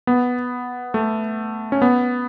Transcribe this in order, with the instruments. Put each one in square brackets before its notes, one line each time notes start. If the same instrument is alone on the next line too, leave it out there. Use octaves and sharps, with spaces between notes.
[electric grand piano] B3
A3
C#4
B3